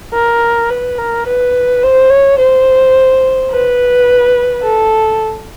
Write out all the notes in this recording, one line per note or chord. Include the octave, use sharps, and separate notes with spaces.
A#4
B4
A#4
B4
C5
C#5
C5
B4
A4